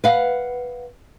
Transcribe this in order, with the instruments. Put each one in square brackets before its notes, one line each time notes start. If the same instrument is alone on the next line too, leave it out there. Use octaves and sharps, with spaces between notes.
[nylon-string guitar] B4 F5 F#5